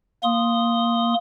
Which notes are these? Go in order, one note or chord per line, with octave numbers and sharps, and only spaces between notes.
A#3 C6 D#6